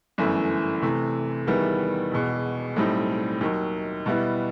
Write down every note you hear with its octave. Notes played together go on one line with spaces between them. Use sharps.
G1 F#2 E3 A3 E4
C3 E3 A3
E2 D#3 G3 B3 E4
E1 E2 B2
B1 A2 G3 C4 D#4
D#2 D#3 F#3
B2 G3 B3 E4